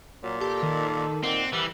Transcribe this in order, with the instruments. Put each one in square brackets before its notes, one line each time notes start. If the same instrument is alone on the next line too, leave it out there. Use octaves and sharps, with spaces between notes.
[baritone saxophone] A#2 [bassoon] F#3
[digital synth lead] G4 [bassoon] A4
[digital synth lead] D#3
[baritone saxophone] A#2 [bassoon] D#3 [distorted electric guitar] C4 [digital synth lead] F#5
[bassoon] C2 [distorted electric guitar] E3 [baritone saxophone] G3